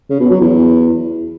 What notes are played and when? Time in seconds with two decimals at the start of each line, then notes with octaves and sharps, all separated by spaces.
0.10 C#3
0.20 B2
0.31 F#3
0.41 E2